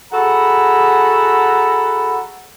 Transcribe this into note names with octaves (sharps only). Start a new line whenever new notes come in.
F#4 G#4 A4 F#5 A#5 B5